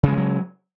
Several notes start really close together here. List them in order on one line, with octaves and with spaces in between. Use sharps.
C#3 G#3 E3 F#3